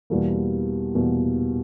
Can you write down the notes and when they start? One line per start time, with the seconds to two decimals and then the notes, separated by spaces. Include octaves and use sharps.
0.10 E2 B2 G3 A#3
0.95 E2 B2 G3 A#3